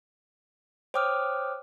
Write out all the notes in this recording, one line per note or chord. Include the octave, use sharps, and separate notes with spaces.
C5 C#5 G5 D6 D#6 F6